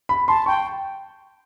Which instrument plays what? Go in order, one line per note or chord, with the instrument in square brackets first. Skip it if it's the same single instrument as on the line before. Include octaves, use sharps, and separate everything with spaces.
[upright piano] B5
[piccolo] A5 [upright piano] C6
[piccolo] G5 [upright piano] C#6